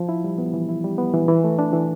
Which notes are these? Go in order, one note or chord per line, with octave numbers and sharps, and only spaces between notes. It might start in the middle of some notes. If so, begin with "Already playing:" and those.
Already playing: F3
E4
G3
B3
E3
E4
G3
B3
E3
E3
A3
D4
E3